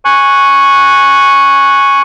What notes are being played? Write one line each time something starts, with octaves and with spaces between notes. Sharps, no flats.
G#5 C#6 F#6